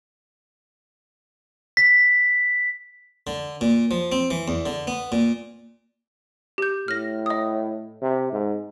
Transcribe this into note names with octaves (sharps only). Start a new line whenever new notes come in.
B6
D3
A#2
F3
C4
E3
E2
D3
B3
A#2
G4 G6
A2 F6 A#6
D#5 D#6
C3
G#2